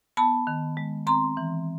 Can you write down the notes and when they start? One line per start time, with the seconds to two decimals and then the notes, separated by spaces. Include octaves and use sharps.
0.17 B3 A5 B5
0.47 D#3
0.77 G#3
1.07 C4 A#5 C6
1.37 E3